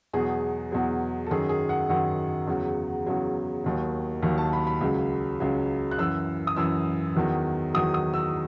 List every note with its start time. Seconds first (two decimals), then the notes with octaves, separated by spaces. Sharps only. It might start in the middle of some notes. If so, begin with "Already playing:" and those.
0.13 E2 B2 F#3 G#4
0.72 E2 B2 F#3
1.26 A4
1.31 F#2 D#3 F#3 G#4
1.49 G#4
1.69 F#5
1.90 F#2 D#3 F#3 F#5
2.47 E2 C#3 F#3
3.06 E2 C#3 F#3
3.64 D#2 D#3 F#3
4.22 D#2 D#3 F#3
4.38 A5
4.53 B5
4.67 B5
4.81 C#2 C#3 F#3
5.40 C#2 C#3 F#3
5.91 F#6
5.98 F#2 E3 E6
6.47 D#6
6.56 F#2 E3 E6
7.16 E2 D#3 F#3
7.74 E2 D#3 F#3 D#6
7.94 D#6
8.14 E6